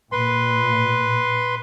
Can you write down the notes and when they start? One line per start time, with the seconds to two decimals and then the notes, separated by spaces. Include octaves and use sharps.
0.12 A#2 B4 C6